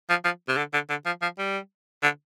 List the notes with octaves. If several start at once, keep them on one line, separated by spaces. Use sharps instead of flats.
F3
F3
C3
D3
D3
D3
F3
F3
G3
D3